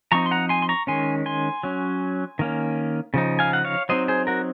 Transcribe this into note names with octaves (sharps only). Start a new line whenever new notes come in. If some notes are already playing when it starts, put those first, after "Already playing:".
F3 C4 D#4 A#5 C#6
C6
F#5 A#5
G#5 C6
C6
A#5 C#6
D#3 G#3 C#4 G#5 C6
G#5 C6
F#3 C#4
D#3 A#3 C#4
C#3 F3 D#4
F5 G#5
F#5
C#5 F5
F#3 C4 D#4 C5 D#5
G#4 C5
F#4 A#4